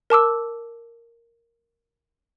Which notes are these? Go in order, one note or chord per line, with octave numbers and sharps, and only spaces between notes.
A#4 A5 D6 E6